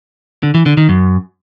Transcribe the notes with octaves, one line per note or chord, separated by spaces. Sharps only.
D3
E3
D3
D#3
F#2